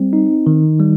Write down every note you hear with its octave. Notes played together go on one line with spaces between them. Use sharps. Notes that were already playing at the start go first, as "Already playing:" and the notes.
Already playing: G3 C4
D#4
D#3
G3